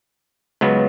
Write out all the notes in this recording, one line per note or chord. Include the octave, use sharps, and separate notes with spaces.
C#2 C#3 F#3 B3